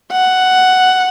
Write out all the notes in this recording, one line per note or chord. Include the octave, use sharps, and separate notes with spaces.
F#5